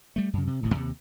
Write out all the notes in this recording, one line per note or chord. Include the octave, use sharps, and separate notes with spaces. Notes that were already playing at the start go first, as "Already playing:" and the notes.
G3 A3
F#2 C#3
C3
D1 G#1 F#2 A2
D#2 C3